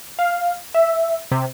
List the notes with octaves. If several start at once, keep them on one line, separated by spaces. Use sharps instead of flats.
F5
E5
C3